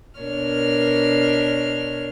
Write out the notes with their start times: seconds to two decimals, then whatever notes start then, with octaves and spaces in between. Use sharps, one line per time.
0.20 B2 D4 A#4 C#5 F6